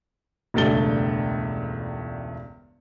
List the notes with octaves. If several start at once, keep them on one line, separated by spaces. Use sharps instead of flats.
E1 C#2 G2 A3 A6 G7